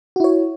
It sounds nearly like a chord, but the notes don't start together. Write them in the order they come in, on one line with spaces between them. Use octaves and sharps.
F#4 E4 C#5